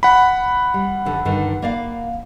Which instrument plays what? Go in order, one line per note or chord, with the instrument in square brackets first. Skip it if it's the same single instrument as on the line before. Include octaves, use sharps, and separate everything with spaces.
[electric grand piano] F#5 B5
[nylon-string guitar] G3
F2 D3
G2 D3 D#3
A#3 D5 F5